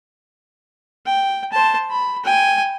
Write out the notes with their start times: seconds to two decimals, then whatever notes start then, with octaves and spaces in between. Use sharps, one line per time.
1.06 G5
1.52 C5 A5
1.91 B5
2.24 G5 G#5